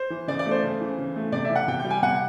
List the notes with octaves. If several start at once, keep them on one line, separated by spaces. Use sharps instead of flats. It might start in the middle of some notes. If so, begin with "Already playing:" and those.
Already playing: C5
E3
C#3 D5
D5
A3
C5
C#3
E3
C#3
A3
C3 D5
E5
E3
F#5
C3 G5
G5
G3
G#5
C3 F#5